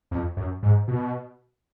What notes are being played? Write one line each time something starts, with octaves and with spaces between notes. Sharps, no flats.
F2
F#2
G#2
B2